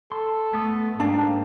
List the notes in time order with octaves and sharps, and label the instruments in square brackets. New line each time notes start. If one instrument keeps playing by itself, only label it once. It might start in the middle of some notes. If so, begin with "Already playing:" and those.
[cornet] A4 [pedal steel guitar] C6
[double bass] A3 [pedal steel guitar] B3 D#6
[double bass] G#2 [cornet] A#3 [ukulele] D4 [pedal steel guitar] G5 A5